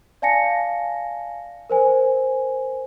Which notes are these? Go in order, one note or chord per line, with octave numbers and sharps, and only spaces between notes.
D5 F5 G#5 A5 A#6 C#7
A#4 C5 G#5